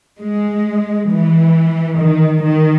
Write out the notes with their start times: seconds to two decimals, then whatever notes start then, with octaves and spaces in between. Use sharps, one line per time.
0.21 G#3
1.10 E3
1.99 D#3
2.43 D#3